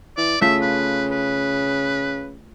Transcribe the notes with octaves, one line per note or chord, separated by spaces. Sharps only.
E3 D5
C#3 A3 F4 E5 B6
B4
B4